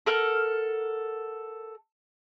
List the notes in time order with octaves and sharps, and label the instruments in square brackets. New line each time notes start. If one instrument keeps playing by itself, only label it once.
[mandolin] A4 A#4 F#5 F6